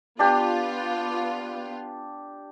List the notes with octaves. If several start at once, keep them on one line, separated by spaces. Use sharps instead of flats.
B3 D4 F4 G4